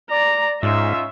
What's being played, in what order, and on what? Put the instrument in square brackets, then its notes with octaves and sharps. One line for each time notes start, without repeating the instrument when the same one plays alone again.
[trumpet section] D5 [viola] A#5
[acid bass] G#2 [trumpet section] C#4 D#4 F4 [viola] E5